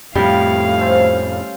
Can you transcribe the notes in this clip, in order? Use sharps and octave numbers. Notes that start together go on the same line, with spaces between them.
F2 A2 G3 A3 F5
C#4 A4 C5